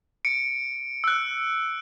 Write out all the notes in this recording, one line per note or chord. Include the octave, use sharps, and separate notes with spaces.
C#7 D7
E6 F#6